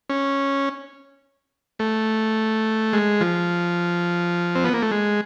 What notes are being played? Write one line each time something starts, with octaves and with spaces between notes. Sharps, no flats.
C#4
A3
G#3
F3
C4
B3
A#3
A3
G#3